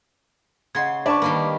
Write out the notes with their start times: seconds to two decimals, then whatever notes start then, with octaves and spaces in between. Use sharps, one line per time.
0.75 C#3 D#5 F#5 C6 G#6
1.06 D4 B4 D5 A5 C#6
1.22 D#3 G3 A#3